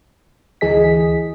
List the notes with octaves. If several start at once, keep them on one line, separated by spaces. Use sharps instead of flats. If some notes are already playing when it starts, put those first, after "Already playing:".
D2 E3 G#4 D#5 B6